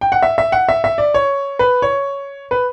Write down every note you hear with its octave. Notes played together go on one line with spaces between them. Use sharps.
G5
F#5
E5
E5
F#5
E5
E5
D5
C#5
B4
C#5
B4